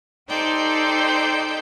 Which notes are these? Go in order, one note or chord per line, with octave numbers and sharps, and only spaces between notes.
D#4 G4 A4 C5 D5 G5